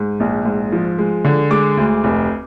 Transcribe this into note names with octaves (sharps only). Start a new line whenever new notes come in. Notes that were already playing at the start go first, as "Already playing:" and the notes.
Already playing: G#2
A#1
G#2
F3
G#3
D3
G#3 D6
D2
F1